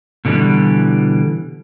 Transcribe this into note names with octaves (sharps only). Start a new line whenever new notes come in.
B2 D3 E3 G3